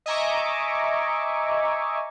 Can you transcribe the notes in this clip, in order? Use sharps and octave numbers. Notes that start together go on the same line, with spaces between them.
D#5 E5 G#5 A#5 C#6 D6